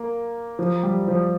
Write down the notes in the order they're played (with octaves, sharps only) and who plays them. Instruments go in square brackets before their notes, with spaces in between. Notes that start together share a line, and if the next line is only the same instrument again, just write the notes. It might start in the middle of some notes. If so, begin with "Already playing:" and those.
Already playing: [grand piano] A#3
F3
G3
F3